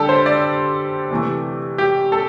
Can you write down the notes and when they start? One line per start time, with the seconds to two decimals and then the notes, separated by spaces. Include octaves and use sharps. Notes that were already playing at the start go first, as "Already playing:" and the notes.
Already playing: D3 G3 G4 A4
0.09 C5
0.26 D5
1.11 C3 E3 A3
1.78 G4
2.12 A4